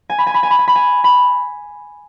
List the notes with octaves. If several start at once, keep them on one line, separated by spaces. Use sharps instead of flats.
G#5
B5
G#5
B5
G#5
B5
G#5
B5
G#5
B5